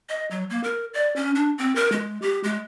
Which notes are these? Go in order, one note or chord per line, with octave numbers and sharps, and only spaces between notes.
D#5
F#3
A#3
A#4
D5
C#4
D4
C4
A#4
G#3
G4
G#3